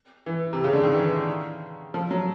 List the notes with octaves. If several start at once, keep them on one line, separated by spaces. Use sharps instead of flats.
E3
C3
C#3
D3
D#3
E3
F3
F#3